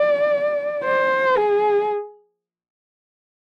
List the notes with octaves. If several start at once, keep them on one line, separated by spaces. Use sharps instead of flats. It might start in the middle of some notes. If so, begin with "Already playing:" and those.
Already playing: D5
C5
G#4